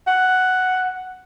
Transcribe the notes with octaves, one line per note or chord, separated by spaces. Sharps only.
F#5